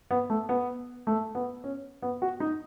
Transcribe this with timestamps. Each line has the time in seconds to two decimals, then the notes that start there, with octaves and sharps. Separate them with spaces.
0.11 B3
0.30 A3
0.49 B3
1.07 A3
1.35 B3
1.64 C#4
2.02 B3
2.22 F#4
2.40 D#4